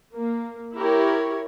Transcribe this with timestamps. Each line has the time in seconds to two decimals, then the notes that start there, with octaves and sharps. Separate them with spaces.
0.14 A#3
0.77 E4 G4 A#4 C#5